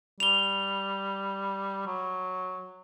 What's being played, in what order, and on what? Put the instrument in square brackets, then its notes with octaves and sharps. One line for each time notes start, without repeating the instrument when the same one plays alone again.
[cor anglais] G3 [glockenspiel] F7 G7
[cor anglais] F#3